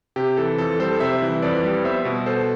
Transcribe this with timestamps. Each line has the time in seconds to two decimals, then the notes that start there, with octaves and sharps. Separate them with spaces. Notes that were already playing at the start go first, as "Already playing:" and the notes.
0.16 C3 G4
0.37 E3 A4
0.58 F2 A4
0.80 G3 A4 C5
1.00 C3 C5 E5
1.22 E3
1.42 F2 B4 D5
1.63 G3
1.84 B3 C5 E5
2.05 B2
2.26 B2 A4 C5